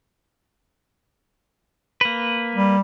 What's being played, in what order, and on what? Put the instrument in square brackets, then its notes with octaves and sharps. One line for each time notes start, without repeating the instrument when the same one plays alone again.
[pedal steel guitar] A#3 B4
[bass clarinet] G3